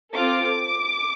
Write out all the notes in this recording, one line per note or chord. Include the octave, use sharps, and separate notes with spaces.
C4 F4 A4 D6